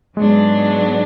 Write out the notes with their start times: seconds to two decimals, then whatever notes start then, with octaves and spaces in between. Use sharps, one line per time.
0.17 G#2 F#3 G#3 B3 D4